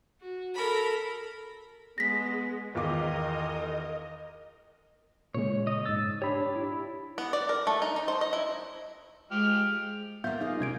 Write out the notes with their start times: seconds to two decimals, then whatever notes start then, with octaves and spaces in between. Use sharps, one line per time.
0.20 F#4
0.55 A4 A#4 B5
1.98 G#3 B3 A#6 B6
2.75 E2 D#3 F4 A#4 D#5 D6
5.34 A#2 C#3 G#3 C#5
5.67 D#5
5.86 G#2 E6 A6
6.22 D4 G4 C#5 B5
6.56 E4
7.18 B3
7.33 D5
7.49 A#4
7.67 A3
7.82 D#4
7.96 D#4
8.08 C5
8.21 D#5
8.33 E4
9.31 F3 G#3 G4 F6
10.24 A#3 B3 F4 E5 G6
10.41 D#4 G#4 D#5 F5
10.61 C3 G3 C#4 G#6 D7